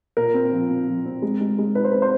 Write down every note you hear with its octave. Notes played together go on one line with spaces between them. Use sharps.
A#2 A#4
C4
F3
C4
F3
C4
G#3
G#3
G#3
D#4 B4
C5
C4 B4
C5